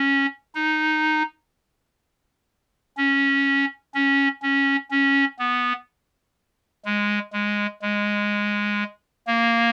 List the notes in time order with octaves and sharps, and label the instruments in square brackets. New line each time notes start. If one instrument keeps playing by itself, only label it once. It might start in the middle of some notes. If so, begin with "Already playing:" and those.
Already playing: [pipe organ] C#4
D#4
C#4
C#4
C#4
C#4
B3
G#3
G#3
G#3
A#3